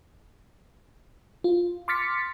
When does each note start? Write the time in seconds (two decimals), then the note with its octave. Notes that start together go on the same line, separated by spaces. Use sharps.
1.44 F4
1.88 C6 D6 F6 A6 B6 C#7